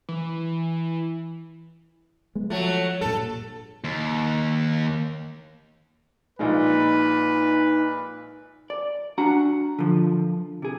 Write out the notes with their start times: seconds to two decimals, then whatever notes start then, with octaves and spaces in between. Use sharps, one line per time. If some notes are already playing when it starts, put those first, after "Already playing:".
0.09 E3
2.35 G#3 B3
2.50 F3 F#3 A3
3.01 G2 A#2 A4
3.84 D#2
6.39 A#1 A#2 G#3 D#4 B4
8.70 D5
9.18 D4 F#4 F#5 A#5
9.79 D3 F3
10.62 C3 G#4